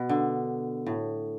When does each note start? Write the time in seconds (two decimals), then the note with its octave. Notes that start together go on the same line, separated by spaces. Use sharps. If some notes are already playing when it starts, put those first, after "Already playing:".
Already playing: B2
0.09 D3
0.86 A2